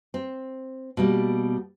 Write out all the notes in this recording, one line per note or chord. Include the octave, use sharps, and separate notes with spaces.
C4
B2 G3 A#3